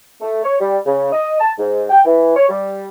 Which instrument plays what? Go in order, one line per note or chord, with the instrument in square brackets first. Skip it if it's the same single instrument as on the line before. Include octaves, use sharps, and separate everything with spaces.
[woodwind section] A3
C#5
G3
C#3
D#5
A5
G#2
G5
E3
C#5
G3